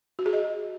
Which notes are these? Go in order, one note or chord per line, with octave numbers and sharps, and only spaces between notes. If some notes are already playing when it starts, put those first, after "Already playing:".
F#4
G#4
D#5